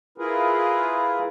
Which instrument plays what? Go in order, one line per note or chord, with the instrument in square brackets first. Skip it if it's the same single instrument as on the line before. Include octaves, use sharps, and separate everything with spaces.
[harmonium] E4 F4 G#4 A#4 B4